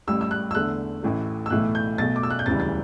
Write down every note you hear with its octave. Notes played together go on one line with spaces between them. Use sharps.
A1 A2 G3 E6
E6
F#6
E6
E2 D3 A3 F#6
A1 A2 E3 A3
E6
B1 A2 E3 A3 F#6
G6
B1 B2 A3 A6
D6
E6
F#6
G6
E1 D2 C#3 E3 G3 A6
A6